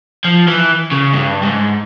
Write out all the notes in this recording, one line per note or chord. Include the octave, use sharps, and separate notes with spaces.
F3
E3
C#3
G2
G#2